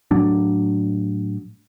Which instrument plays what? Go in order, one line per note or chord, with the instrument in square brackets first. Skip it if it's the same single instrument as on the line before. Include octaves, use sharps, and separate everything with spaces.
[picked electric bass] A2 F#3 D4